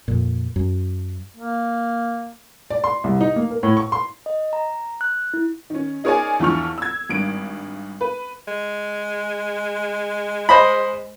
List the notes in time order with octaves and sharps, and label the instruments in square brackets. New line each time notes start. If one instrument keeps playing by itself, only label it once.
[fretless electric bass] F2 A#2
F#2
[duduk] A#3
[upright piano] D5
C6
C2
D#4
A#3
A#4
A2
C#6
C6
[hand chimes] D#5
A#5
F#6
E4
[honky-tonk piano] D#3 C#4
D#4 G#4 A#4 C#5 D5 G#5
E2 F3 D4 C#6 F6
E6 G#6
G#1 G2 D7
B4
[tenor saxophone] G#3
[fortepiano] C5 D#5 B5